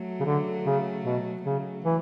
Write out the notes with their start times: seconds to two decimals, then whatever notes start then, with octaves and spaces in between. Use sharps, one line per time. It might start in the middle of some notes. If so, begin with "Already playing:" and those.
Already playing: F#3 A3
0.20 C#3
0.25 D3
0.66 C#3
1.05 B2
1.45 C#3 F#3 A3
1.85 E3